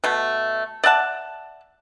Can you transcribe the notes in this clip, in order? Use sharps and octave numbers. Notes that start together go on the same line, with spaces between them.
B2 A3
D5 E5 F#5 A5